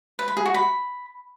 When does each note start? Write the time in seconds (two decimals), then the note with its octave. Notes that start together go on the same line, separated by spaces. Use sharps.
0.19 B4
0.28 B5
0.37 G#4
0.46 F#4
0.54 B5